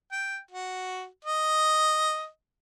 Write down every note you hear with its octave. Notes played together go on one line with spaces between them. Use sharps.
G5
F#4
D#5